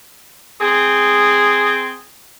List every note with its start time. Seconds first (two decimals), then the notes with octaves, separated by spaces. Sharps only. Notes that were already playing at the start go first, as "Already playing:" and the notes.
0.61 C4 G#4